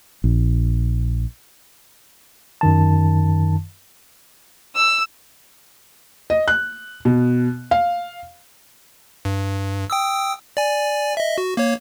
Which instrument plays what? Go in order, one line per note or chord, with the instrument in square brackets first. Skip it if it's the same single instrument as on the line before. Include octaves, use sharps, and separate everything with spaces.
[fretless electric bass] A#1
[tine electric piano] F#2 D#3 A5
[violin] E6
[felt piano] D#5
F#6
B2
F5
[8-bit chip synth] G2
G5 D#6 E6
D5 G#5
D#5 E5
F#4
A#3 C#5